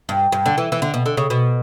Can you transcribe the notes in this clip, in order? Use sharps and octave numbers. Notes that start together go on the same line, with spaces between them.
G2
G2
D3
E3
E3
D3
B2
D3
C#3
B2